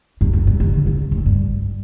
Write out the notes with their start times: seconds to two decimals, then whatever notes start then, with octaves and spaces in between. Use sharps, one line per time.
0.21 F#2
0.33 F#2
0.47 G2
0.60 D#3
0.74 D3
0.86 C3
1.12 A2
1.26 G2